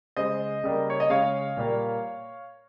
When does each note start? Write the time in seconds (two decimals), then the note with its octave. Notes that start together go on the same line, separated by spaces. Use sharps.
0.17 C#3 G#3 C5 D#5
0.64 C#3 G3 A#3
0.90 C#5
1.00 D#5
1.10 C#3 G#3 C#5 F5
1.57 A#2 G3 A#3